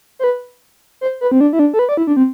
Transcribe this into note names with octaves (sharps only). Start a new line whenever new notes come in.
C5
B4
C5
B4
C4
D4
E4
D4
A4
B4
D5
E4
D4
C4